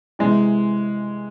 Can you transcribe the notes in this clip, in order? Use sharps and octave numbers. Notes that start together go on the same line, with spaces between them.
C3 E3 G#3